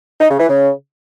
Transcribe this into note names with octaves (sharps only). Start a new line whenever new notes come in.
D#4
C#3
E3
C#3